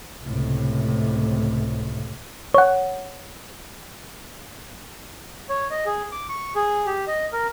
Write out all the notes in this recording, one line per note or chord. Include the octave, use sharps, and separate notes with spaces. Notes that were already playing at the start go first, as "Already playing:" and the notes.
C#2 A2 C3
C#5 F#5
C#5
D#5
G#4
D6
C#6
G#4
G4
D#5
A#4